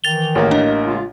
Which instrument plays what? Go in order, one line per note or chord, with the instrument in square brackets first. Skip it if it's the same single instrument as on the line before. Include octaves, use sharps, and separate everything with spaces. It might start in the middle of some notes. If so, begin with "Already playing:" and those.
[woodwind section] D#3 E3 [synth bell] A6 F7 G7
[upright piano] A1 A#3
[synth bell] D4 D#5
[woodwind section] C#3 G#3 F4